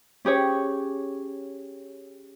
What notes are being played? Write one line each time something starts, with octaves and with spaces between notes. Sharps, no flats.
C#4 G4 G#4 C#5